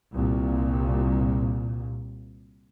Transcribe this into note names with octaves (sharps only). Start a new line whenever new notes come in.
C2 A#2